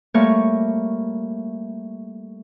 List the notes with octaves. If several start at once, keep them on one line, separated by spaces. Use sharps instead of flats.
G3 A3 A#3 C#5 C#6